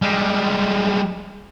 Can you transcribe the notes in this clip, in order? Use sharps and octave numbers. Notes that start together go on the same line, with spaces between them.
G3 G#3